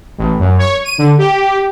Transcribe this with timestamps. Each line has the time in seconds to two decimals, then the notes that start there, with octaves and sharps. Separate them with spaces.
0.18 A1
0.39 F#2
0.58 C#5
0.85 D#7
0.98 D3
1.18 G4